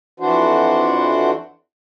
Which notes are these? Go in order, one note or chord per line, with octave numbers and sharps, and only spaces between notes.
F2 E3 D4 F#4 C5